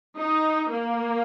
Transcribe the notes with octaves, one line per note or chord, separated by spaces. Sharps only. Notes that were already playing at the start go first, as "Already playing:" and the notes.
D#4
A#3